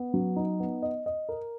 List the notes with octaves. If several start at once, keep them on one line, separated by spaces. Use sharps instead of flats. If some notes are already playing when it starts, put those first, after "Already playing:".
Already playing: B3
F#3
D#4
B3
D#5
D#5
A#4